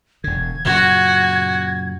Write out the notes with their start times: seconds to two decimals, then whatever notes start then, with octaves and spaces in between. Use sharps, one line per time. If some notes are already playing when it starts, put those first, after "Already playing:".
0.24 E1 D3 G#6
0.65 F#2 A#2 C#3 F#4